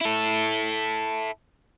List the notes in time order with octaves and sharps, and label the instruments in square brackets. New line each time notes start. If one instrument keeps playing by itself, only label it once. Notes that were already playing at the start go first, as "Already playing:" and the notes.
[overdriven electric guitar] E4 A4